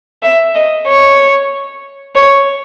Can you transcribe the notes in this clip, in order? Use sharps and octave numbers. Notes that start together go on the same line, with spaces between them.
E5
D#5
C#5
C#5